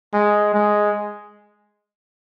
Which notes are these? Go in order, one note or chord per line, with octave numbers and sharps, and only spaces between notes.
G#3
G#3